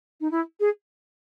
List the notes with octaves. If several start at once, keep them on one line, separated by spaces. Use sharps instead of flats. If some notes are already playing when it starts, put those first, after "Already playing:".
D#4
E4
G#4